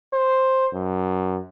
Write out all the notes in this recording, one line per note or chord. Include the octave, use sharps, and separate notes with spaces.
C5
F#2